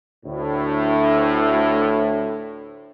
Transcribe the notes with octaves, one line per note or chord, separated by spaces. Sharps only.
D2 A2